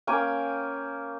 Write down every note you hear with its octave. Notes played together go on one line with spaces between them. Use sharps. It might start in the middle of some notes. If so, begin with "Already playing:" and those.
A#3 C#4 G5 G#5